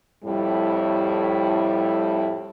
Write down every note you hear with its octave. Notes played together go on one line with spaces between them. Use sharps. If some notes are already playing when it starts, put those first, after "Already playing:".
F2 A2 G3 E4